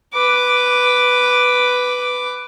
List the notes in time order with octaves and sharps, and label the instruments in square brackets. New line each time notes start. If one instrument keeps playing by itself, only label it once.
[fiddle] B4 D6